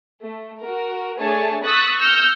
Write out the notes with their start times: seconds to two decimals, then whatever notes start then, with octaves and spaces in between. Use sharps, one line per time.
0.22 A3
0.61 F#4 A#4
1.18 A3 D4 G#4 C#5 G#5 A5
1.65 C#6 D#6 E6 F#6 A6 B6
2.00 E6 F6 G6 A#6 C#7